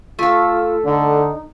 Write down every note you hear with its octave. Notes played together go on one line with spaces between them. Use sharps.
A3 F4 A4
D3 D#4